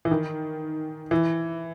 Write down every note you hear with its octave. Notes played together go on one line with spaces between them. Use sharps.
E3
D#3
E3